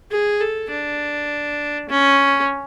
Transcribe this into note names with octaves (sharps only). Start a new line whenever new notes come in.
G#4
A4
D4
C#4